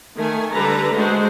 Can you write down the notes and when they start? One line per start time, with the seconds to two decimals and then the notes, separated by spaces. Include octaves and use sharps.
0.17 D#3 A3 G#5
0.52 D3 G3 A4 B4 A#5
0.94 G#3 A3 D4 F#4 C5